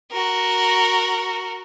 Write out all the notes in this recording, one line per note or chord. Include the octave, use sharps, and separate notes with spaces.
F#4 A#4